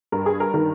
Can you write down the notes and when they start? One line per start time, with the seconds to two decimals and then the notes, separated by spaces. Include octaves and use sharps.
0.12 G2 A#4
0.26 G#4
0.40 A#4
0.54 D#3 A#4